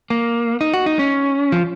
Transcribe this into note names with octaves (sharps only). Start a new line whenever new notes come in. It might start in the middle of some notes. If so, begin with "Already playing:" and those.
A#3
D#4
F#4
D#4
C#4
F3